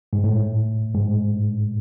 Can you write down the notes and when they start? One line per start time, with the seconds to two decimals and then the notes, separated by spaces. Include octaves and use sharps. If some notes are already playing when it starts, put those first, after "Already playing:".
0.13 G#2
0.24 A2
0.95 G#2